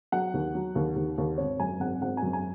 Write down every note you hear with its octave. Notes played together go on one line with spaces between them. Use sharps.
F#3 F#5
D#2
F#3
D#2
D#2
D#2
G#1 C#5
F#2 G#5
G#1 F#5
G#1 F#5
G#5
F#2
G#5